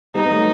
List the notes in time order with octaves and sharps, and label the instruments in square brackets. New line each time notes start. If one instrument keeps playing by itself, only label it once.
[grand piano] G3 B3 [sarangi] D#4
[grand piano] B3
F#3 A3